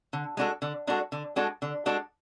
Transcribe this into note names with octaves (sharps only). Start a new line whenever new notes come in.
D3
G#3 D4 F#4 A4
D3
G#3 D4 F#4 A4
D3
G#3 D4 F#4 A4
D3
G#3 D4 F#4 A4